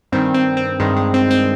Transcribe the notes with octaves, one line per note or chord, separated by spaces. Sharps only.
G2 D#3 C4
C4
C4
G2 D#3 G#3
G#3
C4
C4